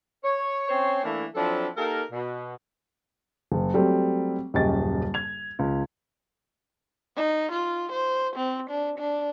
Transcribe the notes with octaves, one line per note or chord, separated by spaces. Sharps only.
C#5
C4 C#4 C5 C#5
E3 A3 A#3 D4 E4
F3 F#3 C4 D4 E4 A4
A#3 D#4 G4 A4 A#4
B2
F#1
F#3 G3 A3 C4
D#1 F#2 C#3 G4 D#5 A6
G#6 F7
C#2
D#4
F4
C5
C4
D4
D4